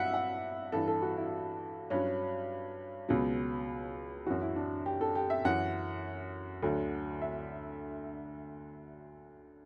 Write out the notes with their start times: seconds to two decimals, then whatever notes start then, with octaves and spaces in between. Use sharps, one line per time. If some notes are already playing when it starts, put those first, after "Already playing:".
Already playing: G2 F#3 E5 F#5
0.14 F#5
0.72 G2 E3 A4
0.88 A4
1.02 F#4
1.17 E4
1.90 G2 F#3 C#4
3.09 C#2 B2 F#3
4.26 F#2 E3 F#4
4.41 E4
4.56 D4
4.86 G4
5.01 A4
5.15 G4
5.30 E5
5.45 F#2 E3 F#5
6.63 D2 D3 F#3
7.22 E5